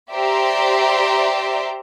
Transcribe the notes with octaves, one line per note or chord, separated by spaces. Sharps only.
G4 C5 D5 E5 A#5 C6